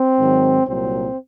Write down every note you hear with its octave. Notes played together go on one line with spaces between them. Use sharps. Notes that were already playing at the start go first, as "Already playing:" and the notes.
Already playing: C4
G#2 D#3 F#3
C2 A#2 F#3 C4